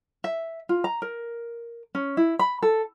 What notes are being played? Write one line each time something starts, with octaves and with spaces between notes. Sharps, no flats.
E5
F4
A#5
A#4
C#4
E4
B5
A4